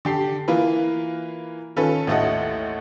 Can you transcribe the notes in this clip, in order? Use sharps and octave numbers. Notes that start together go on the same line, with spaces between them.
D3 G4 C7
E3 A#3 F4 A#4 B4
D#3 C#4 F4 A4 B4
A1 D#2 A3 A4 D#5 F#5